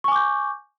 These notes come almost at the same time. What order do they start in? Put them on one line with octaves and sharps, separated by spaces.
C#6 G#5 D6 G6